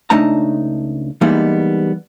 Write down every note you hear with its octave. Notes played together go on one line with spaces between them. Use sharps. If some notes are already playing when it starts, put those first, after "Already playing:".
C#2 A3 D4 D#4 A5 A#5
E3 G3 G#3 A#3 B3 D#4